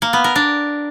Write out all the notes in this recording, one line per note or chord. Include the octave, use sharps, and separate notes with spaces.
A#3
B3
A#4
D4